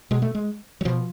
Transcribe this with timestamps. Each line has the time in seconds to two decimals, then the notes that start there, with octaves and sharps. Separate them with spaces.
0.11 B2 G#3
0.22 A3
0.35 G#3
0.81 F#3
0.85 B2 F3